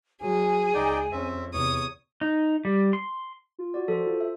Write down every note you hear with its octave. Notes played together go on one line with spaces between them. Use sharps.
F#3 G#4 G#5
C#2 D#4 D5 G5
F2 C4 C#4 E5
E2 C3 C#5 D#6
D#4
G3
C6
F4
F#4 D5
F3 A4 C5
F4
E5